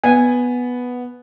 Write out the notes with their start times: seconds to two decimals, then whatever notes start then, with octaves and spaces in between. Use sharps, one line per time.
0.04 B3 G#5